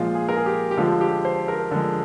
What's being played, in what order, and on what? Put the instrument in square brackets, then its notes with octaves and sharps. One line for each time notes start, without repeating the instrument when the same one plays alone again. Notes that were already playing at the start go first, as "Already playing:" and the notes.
Already playing: [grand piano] A#2 F3 G#3 F4
G#4
A#4
G#4
G4
G4
D3 F3 G#3 F4
G4
C5
A#4
D3 F3 G#3